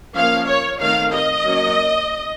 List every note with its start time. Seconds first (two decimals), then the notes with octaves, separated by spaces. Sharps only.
0.16 F3 A#3 C#4 F5
0.48 C#5
0.80 D#3 A3 C4 F5
1.12 D#5
1.44 F#3 A#3 C#4